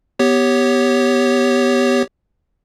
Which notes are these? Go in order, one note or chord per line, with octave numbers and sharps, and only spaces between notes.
B3 G4 C#5